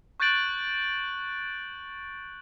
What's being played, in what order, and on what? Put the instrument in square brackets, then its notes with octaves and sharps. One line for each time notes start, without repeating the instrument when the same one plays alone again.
[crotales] C#6 F#6 G6 A6 D7 F#7